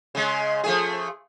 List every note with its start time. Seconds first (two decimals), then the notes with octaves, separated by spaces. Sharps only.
0.15 C#3 G#3
0.64 F3 A3 G#4